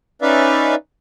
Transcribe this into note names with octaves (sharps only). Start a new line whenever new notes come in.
C#4 D#4 B4 D5 E5 F5